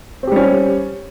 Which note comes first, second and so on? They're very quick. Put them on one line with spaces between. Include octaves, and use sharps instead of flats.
C4 G4 G3 C#4